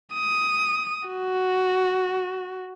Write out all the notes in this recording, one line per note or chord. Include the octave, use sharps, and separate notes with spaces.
D#6
F#4